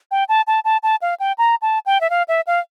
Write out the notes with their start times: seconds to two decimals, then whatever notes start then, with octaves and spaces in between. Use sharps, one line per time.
0.11 G5
0.29 A5
0.47 A5
0.65 A5
0.83 A5
1.02 F5
1.20 G5
1.38 A#5
1.62 A5
1.86 G5
2.01 E5
2.10 F5
2.28 E5
2.47 F5